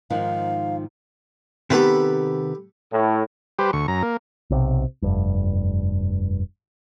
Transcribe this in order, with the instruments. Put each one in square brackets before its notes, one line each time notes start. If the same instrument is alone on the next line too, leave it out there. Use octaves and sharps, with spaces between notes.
[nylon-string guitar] G#2 D#3 F3 [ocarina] F5
[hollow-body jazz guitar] C3 D#3 B3 [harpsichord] G4 A4 B4
[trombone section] A2
[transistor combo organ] G3 G4 B4 C5
D2 C#6
F#2 A#5
A#3
[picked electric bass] B1 C3
F1 G2